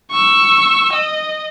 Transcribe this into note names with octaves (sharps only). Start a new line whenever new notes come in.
C#6 E6
D#5